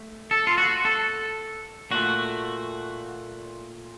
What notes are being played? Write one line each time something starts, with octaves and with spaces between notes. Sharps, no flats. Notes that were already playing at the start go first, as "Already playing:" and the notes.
Already playing: A3
A4
F4
F#4
A4
A#2 A3 F#4